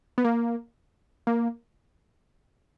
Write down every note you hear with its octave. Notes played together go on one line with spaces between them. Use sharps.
B3
A#3
A#3